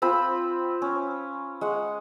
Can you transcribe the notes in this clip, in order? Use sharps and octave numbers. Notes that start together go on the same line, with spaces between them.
C4 F4 B5 E6
C#4
G#3 F#5